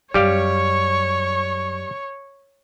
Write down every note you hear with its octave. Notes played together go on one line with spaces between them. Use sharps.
F#2 G3 G4 C#5 F5 C#6